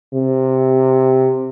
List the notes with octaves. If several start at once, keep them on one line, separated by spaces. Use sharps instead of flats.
C3